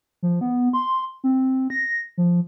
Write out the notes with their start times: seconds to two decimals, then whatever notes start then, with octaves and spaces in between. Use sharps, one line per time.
0.23 F3
0.41 B3
0.73 C6
1.24 C4
1.70 A#6
2.18 F3